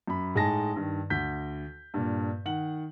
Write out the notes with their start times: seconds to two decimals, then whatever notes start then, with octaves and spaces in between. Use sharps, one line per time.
0.07 F#2 B5
0.35 A2 G#3 D#4 G#5 A5 A#6
0.76 G2 D#3
1.10 D2 G6 B6
1.94 G2 A#2
2.45 D#3 F#5 F#7